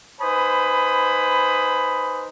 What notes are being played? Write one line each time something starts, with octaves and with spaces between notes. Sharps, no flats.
D#4 B4 C5 G#5 B5 D#6